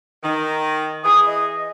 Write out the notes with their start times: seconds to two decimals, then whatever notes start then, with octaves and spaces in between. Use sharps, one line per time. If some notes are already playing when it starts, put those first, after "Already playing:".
0.23 D#3
1.04 E3 G#4 D#6
1.26 D#5